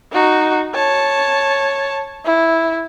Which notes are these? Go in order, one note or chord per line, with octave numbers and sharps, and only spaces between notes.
D#4 F#4
C#5 A5
E4